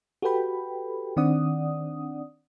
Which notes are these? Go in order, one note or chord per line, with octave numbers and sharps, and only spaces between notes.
F#4 G4 A4 B4 G5 B5
D#3 C4 D4 D5 F#5 D#6